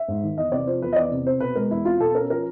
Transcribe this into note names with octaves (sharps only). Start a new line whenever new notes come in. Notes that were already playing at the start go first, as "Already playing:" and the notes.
Already playing: E5
G#2
D#3
E2 D#5
C3 D5
F3 C5
E2 B4
D#5
E2 D5
C3
C4 C5
B2 B4
G#3 A#4
E2 E4
C4 F4
B2 A4
C#4 A#4
F3 A#4